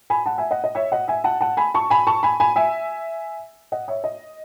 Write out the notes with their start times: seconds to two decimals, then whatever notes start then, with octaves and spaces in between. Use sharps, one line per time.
0.10 G#5 B5
0.26 F#5 A5
0.38 E5 G#5
0.51 D#5 F#5
0.64 D#5
0.75 C#5 E5
0.92 D#5 F#5
1.08 E5 G#5
1.24 F#5 A5
1.41 F#5 A5
1.57 G#5 B5
1.74 A5 C#6
1.90 G#5 B5
2.07 A5 C#6
2.23 G#5 B5
2.40 G#5 B5
2.56 E5 G#5
3.72 D#5 F#5
3.88 C#5 E5
4.04 D#5